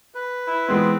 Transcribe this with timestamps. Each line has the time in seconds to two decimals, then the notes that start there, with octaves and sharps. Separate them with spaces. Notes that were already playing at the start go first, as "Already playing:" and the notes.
0.15 B4
0.47 E4
0.68 E3 G#3 B3 C4